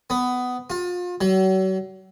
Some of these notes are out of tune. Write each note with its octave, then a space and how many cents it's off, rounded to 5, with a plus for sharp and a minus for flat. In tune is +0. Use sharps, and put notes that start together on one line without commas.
B3 +15
F4 +35
F#3 +40